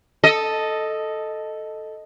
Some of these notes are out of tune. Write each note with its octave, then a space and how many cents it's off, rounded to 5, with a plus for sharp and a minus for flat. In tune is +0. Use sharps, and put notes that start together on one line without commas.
A4 +0 D#5 +0